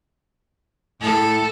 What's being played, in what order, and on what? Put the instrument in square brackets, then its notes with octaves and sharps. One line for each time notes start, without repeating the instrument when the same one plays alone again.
[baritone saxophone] A2 [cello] A4